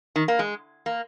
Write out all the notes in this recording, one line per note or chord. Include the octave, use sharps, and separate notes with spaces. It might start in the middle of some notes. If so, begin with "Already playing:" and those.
D#3
A#3
G#3
A#3